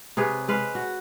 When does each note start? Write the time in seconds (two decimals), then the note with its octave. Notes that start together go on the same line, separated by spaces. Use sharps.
0.17 C3 G#4 B4 C#5
0.48 G#3 B4 F5
0.75 F#4